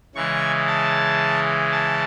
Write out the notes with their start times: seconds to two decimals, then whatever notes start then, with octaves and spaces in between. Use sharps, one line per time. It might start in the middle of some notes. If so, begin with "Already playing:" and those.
0.15 C#3 E3 G#3 C#6
0.67 A5
1.72 A5